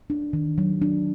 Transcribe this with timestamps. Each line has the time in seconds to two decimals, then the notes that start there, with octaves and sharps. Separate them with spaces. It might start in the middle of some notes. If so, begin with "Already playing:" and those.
0.10 D4
0.33 D#3
0.58 F#3
0.82 D4